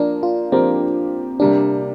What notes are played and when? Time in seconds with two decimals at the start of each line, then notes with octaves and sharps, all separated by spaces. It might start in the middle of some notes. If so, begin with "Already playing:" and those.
Already playing: F3 A#3 D4 A#4
0.23 F4
0.52 F3 A#3 C4 G4 A#4 D5
1.40 C3 G3 A#3 D4 G4